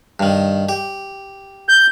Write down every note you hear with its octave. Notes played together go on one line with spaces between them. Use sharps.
G2 D#3
G4
G6